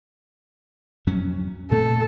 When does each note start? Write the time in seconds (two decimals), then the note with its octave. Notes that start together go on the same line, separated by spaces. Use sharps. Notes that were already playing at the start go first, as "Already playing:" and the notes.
1.07 F2 F#3 C#4
1.71 A#2 A3 C4 A4